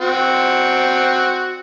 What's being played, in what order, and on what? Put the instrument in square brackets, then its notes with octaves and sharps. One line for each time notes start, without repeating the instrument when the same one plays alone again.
[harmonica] C4 F#4